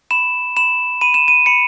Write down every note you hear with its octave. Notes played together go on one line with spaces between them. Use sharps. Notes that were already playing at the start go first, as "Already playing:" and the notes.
B5 E7
B5 E7
B5 D#7
E7
D#7
B5 C#7